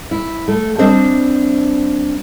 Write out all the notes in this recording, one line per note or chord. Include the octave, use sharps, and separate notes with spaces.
E4
A3
G3 C4 D4 C5 D#5 E5